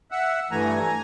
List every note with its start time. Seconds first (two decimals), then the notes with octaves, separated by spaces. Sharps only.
0.11 E5 F#5
0.51 G2 E3 A3 G#5 A#5